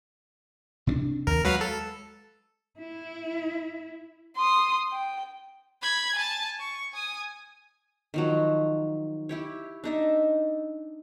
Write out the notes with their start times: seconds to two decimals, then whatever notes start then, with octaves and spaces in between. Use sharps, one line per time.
0.87 C3 C4 D4
1.27 D#2 A#4
1.44 F#3 G#3 B4 F5
1.61 A4
2.79 E4
4.37 C6 D#6
4.92 G5
5.82 B5 G#6
6.15 G#5 A5
6.59 C#6
6.93 G#5 D#6
8.14 D#3 F3 F#3
9.29 E4 G4 C#5
9.84 D4 D#4 E5